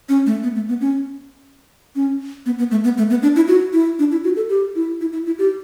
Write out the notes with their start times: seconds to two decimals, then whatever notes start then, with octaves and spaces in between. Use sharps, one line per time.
0.09 C#4
0.26 A3
0.43 B3
0.56 A3
0.69 B3
0.81 C#4
1.96 C#4
2.46 B3
2.58 B3
2.71 A3
2.84 B3
2.98 A3
3.10 B3
3.22 D4
3.36 E4
3.48 F#4
3.73 E4
3.99 D4
4.12 E4
4.24 F#4
4.36 A4
4.49 G4
4.75 E4
5.01 E4
5.13 E4
5.26 E4
5.38 G4